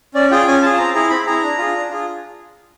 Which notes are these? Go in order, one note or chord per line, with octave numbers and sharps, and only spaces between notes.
C#4 D5
F4 G#4 G5
C#4 G#5
F4 G#4 A5
A5
C4 A#5
E4 G#4 A#5
C4 B5
E4 G#4 A#5
D4
F4 G#4
D4
F4 G#4